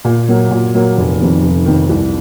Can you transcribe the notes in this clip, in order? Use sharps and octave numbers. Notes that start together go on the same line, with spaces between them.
A#2
F#3 A#3
A#2
F#3 A#3
F1
F2 C3 D#3
F1
F2 C3 D#3
C2